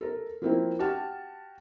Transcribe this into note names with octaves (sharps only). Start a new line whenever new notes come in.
A4 A#4
F3 A#3 C4 E4
F#4 G4 G5 A5 F6